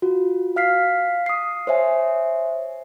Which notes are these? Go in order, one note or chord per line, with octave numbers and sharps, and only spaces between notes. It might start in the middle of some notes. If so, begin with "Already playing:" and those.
F4 F#4
F5 F6 B6 C7
D#6 C7
C5 C#5 E5 G#5